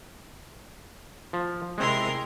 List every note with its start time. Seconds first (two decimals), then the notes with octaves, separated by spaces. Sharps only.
1.33 F3
1.78 C3 G#3 C4 E4 A#4 C6